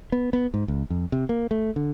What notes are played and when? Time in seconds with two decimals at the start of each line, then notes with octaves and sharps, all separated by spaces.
0.12 B3
0.33 B3
0.54 G#2
0.68 C#2
0.90 F2
1.12 C3
1.29 A#3
1.51 A3
1.76 D3